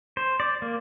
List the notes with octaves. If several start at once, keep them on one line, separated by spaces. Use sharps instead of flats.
C5
D5
A#3